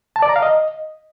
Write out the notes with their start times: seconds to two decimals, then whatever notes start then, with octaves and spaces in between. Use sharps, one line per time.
0.16 A5
0.22 D5
0.29 A#5
0.36 F5
0.42 D#5